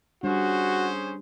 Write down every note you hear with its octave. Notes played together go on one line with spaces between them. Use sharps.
G3 C#4 D4 F#4 G#4 C5